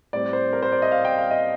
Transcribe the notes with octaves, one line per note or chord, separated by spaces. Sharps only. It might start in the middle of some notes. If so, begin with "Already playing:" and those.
A2 G3 C4 D5
C5
A#4
C5
D5
D#5
F5
G5
F5
D#5